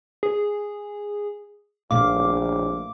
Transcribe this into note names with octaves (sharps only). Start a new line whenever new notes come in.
G#4
A#1 A#2 A3 F5 D6